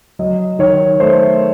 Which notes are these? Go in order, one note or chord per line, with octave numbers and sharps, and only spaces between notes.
F#3 D#5
D#3 C#5
A3 C5